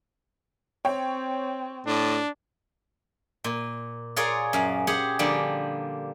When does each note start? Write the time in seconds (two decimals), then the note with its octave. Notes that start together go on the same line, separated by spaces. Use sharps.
0.85 C4 C#5 G5
1.87 A2 D4
3.44 A#2
4.16 F4 G#4 A#4 C#5 D5 C6
4.53 F#2 F5
4.87 G4 G#4 C5 F#5
5.19 D3 F3 G3 A#3 D4